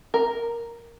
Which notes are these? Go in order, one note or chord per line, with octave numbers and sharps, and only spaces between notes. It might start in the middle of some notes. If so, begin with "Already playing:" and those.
A#4